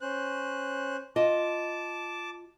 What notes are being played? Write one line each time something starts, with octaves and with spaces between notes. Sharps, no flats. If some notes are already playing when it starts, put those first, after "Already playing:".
C#4 C5 F#6
F4 D#5 A5 D6